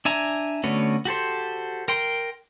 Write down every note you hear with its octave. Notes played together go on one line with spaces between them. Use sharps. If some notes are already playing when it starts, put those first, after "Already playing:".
D4 E5 G#5 A#5
D3 A3 B3 C#4 F#4
F#4 G4 A4 C5
A#4 G5 C6